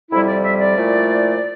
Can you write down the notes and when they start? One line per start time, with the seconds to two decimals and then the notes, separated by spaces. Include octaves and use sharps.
0.11 F2 C3 G3 E4
0.28 D5
0.44 E5
0.60 D5
0.76 A#2 F3 A3 E4